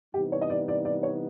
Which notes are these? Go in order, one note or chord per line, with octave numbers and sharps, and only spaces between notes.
C3 E3 G3 B3 D#4 G4
C#5
D#5
D5
D5
D5
C#5